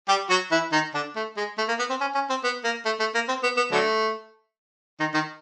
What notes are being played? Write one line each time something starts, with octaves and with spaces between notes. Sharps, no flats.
G3 G4
F#3 F#4
E3 E4
D#3 D#4
D3 D4
A3
G#3
A3
A#3
B3
C4
C#4
C#4
C4
B3
A#3
A3
A3
A#3
C4
B3
B3
D3 F#3 A3
D#3 D#4
D#3 D#4